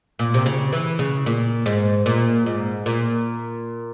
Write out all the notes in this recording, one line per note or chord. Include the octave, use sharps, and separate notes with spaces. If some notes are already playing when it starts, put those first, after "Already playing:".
A#2
C3
C#3
E3
C#3
A#2
G#2
A#2
G#2
A#2